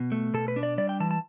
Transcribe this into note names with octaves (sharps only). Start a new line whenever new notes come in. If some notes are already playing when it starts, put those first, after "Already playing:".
Already playing: B2
A3
B2 A4
B4
D4
D5
G3 D5
G5
E3 A5
A5